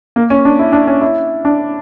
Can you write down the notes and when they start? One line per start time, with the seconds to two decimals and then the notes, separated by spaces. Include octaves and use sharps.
0.16 A#3
0.30 C#4
0.45 D4
0.59 E4
0.73 D4
0.87 C#4
1.01 E4
1.45 D4